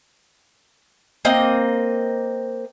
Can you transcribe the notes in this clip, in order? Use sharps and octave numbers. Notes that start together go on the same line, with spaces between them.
A#3 C4 D#5